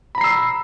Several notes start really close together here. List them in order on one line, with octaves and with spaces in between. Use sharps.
B5 A#5 C7 E6